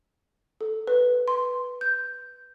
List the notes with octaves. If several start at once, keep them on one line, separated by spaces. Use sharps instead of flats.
A4
B4
C6
G6